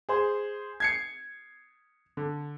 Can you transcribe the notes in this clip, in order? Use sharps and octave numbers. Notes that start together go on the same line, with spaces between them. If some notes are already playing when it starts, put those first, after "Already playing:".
G#4 C5
G#6 C7 C#7
D3